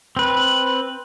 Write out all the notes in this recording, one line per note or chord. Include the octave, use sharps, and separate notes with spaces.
C4 B4